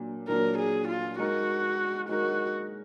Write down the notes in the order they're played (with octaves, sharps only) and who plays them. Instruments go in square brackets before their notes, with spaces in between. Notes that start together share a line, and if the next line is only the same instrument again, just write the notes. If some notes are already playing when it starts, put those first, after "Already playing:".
Already playing: [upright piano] A#2 F#3 D4
[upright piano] A#2 F#3 D4 [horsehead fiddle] A#4
[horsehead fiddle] G#4
F4
[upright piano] G#3 D#4 A#4 [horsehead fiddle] F#4
[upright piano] G#3 D#4 A#4 [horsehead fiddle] F#4